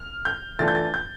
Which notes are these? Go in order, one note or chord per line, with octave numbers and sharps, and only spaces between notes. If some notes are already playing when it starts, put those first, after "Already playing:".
Already playing: F6
G6
E3 A3 D4 F4 A6
G6
A6
G6